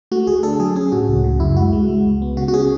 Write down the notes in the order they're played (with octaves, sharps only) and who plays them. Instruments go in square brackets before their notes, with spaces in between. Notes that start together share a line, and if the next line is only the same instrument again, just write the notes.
[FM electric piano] A3 F#4
D2 G#4
D4 A4
F#3 G#4
C#4 G#4
A2 F#4
C#2
C#3
F#2 E4
G#3 F#4
G#3
G#3
C#2
B3
C#3 F#4
F#4
C#4 G#4